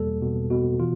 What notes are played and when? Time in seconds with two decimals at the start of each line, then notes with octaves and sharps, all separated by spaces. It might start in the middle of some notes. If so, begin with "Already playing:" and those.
Already playing: E2 B2 G3 A#3 A4
0.22 B2
0.50 B2 F#4
0.80 E3 F4